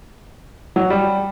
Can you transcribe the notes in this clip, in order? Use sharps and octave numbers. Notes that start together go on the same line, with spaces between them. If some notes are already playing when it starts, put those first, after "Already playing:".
F#3
G3